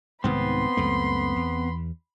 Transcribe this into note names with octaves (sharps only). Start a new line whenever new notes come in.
C2 G#2 D#3 B3 C4 B5 C6
C#2 F#2 A3
E2